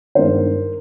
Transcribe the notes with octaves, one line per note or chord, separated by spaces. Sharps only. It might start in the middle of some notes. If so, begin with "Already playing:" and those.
G2 D#3 G#3 B3 E4 A#4 C5